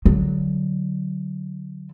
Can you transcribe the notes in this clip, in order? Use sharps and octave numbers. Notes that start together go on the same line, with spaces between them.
D3 F#3